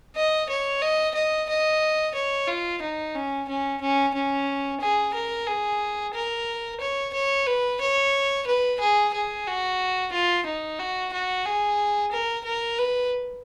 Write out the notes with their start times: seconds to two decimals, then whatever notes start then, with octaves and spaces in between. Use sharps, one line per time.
0.16 D#5
0.50 C#5
0.82 D#5
1.15 D#5
1.49 D#5
2.15 C#5
2.48 F4
2.82 D#4
3.15 C#4
3.49 C#4
3.81 C#4
4.14 C#4
4.81 G#4
5.14 A#4
5.47 G#4
6.14 A#4
6.80 C#5
7.14 C#5
7.47 B4
7.81 C#5
8.47 B4
8.80 G#4
9.14 G#4
9.47 F#4
10.12 F4
10.46 D#4
10.79 F#4
11.13 F#4
11.46 G#4
12.12 A#4
12.45 A#4
12.78 B4